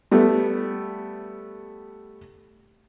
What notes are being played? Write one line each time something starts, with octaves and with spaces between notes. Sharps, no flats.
G3 A3 B3